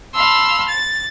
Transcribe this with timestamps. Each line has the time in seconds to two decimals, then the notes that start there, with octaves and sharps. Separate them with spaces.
0.14 F5 A5 B5 C6 E6
0.67 A6